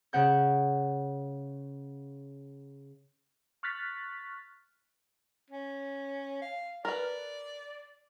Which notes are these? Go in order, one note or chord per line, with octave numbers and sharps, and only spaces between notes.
C#3 F#5 G6
C#6 F6 F#6 A6 B6
C#4
F5
A#4 B4 D5